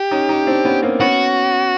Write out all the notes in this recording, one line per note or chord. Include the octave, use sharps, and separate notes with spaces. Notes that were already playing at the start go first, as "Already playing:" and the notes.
Already playing: G4
C#4 D#4
C#4 D#4
C4 D4
B3 C#4
A#3 C4
B3 C#4 F#4